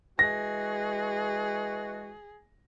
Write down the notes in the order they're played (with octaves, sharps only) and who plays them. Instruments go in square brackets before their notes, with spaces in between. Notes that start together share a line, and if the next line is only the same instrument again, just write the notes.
[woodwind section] E3 G#3 F#4 [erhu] G#4 [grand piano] A#6